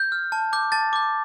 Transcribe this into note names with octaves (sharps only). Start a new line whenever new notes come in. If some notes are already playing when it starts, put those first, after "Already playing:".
Already playing: G6
F6
A5
D6 G6
A5 A6
D6 G6